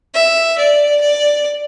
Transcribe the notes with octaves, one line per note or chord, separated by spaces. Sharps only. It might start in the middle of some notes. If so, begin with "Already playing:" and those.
E5
D5
D5